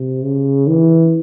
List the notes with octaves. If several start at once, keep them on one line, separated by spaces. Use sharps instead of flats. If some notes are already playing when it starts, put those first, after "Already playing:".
Already playing: C3
C#3
E3